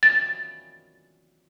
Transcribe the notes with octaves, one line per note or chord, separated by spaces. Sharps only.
A6